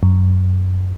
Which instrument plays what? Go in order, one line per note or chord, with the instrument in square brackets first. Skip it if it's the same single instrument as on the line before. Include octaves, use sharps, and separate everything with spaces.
[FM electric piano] F#2